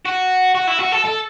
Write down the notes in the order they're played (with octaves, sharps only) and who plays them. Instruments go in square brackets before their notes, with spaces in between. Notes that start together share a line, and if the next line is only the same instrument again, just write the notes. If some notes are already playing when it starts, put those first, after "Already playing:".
[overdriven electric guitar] F#4
F#4
E4
F#4
A4
A4